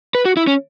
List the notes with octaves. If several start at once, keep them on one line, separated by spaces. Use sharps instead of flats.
B4
F#4
E4
C#4